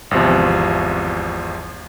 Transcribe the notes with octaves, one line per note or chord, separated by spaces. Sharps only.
G#1 E2 C3 F3